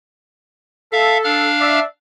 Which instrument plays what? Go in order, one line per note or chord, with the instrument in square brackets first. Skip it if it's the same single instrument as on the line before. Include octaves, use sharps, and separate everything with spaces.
[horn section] A4 [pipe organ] E5 F5
[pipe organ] D4 F5 F6
[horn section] D5 E5